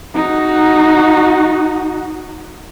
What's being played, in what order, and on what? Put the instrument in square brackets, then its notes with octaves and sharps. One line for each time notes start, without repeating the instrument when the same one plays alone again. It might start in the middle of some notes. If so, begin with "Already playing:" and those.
[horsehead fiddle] D#4 F#4